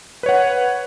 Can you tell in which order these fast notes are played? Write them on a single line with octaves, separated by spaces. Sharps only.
B4 C#5 F#5